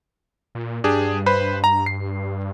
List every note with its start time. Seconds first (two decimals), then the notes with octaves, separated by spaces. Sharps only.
0.55 A#2
0.84 G2 D4 G4 G#4
1.26 B4 C5 B5
1.64 A#5
1.86 C7